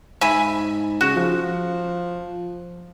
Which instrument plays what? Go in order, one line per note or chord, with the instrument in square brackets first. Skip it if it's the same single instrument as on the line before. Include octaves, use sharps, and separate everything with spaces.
[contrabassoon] G#2 [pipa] E5 G#5 B5
[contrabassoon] C#3 [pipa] F#4
[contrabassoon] F3